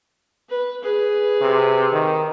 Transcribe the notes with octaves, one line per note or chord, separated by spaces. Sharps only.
B4
G#4 B4
C3
D#3